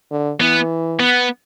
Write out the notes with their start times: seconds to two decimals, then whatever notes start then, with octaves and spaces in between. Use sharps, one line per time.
0.11 D3
0.40 E3 B3
1.00 B3